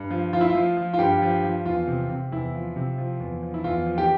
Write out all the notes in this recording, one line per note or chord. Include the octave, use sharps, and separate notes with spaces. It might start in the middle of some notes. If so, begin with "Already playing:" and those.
Already playing: G2
F3
F3 F4
E4
F4
F3
F3
F4
G2 G4
F3
F3
E2 F4
C3
C3
E2 E4
F3
C3
F3
E2
F3
E4
E2 F4
F3
G4